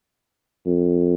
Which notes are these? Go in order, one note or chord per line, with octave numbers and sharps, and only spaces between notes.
F2